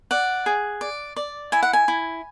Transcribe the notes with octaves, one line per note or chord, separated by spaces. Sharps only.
D5 F#5
G#4
D5
D5
E4 G#5
F#5
G#5
E4